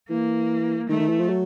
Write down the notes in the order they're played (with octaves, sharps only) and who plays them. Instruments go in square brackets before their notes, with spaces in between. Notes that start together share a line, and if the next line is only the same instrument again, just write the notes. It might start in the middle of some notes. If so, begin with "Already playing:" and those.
[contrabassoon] E3 [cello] A#3
[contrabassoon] D#3 [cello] A3
[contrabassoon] D#3
E3
F3
F#3